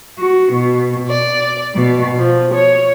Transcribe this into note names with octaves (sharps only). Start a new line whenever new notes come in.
F#4
B2
D5
B2
F3
C#5